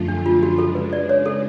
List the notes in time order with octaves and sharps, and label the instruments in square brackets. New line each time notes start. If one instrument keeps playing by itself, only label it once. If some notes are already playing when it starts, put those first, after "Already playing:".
Already playing: [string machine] F#2 D3 F3 A3 F4
[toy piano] D4
F4
F#4
[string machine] C#3 G#3 D4 [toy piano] A4
[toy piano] B4
D5
C#5
A4